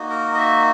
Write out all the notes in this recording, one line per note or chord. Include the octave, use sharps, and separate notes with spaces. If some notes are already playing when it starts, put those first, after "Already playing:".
Already playing: A#3 D#4 F#4
A#4
D#5
E5